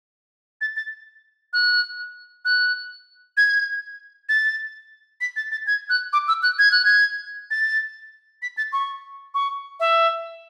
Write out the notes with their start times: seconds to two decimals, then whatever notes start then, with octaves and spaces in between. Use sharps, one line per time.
0.61 A6
0.76 A6
1.53 F#6
2.45 F#6
3.37 G#6
4.29 A6
5.21 B6
5.36 A6
5.52 A6
5.67 G#6
5.90 F#6
6.13 D6
6.28 E6
6.43 F#6
6.59 G#6
6.72 F#6
6.85 G#6
7.51 A6
8.42 B6
8.57 A6
8.73 C#6
9.34 C#6
9.80 E5